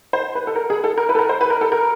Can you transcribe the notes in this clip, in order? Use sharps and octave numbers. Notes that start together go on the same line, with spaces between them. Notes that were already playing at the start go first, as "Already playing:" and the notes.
C5
B4
A4
A#4
G#4
A4
A#4
B4
A4
A#4
C5
B4
A#4
A4
A#4